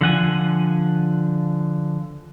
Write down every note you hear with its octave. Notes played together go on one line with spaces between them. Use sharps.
D3 F3 F#5 G#5